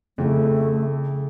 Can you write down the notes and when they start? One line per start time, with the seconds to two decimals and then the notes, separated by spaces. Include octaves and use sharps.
0.18 F2 C#3 A3 E4 G#4